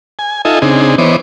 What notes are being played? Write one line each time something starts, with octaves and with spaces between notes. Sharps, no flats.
G#5
D#4 F4 A4 D#5 E5 G#5
C#3 C4 D4 D#4 G#4
E3 B3 C5 C#5 D#5 D6